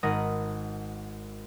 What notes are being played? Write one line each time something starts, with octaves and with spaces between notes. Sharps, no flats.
G#1 A#4 F#5 D#6 A#6